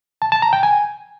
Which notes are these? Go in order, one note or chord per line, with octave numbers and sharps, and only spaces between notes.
A5
A5
A#5
G5
G#5